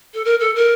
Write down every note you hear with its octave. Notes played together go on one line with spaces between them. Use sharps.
A4
A#4
A4
A#4